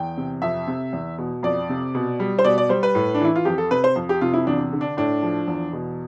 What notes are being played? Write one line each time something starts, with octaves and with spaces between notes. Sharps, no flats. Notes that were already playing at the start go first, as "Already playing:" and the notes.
Already playing: E2 G5
C3
F2 E5
C3
E2
B2
F2 D5
C3
B2
G3
C5
B2 D5
D5
G3 C5
B4
A2
D4
E3 E4
F4
F2 G4
A4
C3 B4
C5
F2
G4
C3 F4
E4
E2 D4
D3
D4
A2 D4
F3
E2
B2